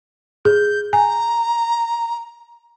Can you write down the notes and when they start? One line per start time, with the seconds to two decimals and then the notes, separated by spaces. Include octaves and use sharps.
0.45 G#4 G6
0.93 G#5 A#5